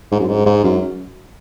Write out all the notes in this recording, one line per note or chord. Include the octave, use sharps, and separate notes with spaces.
G#2
F#2
G#2
G#2
F#2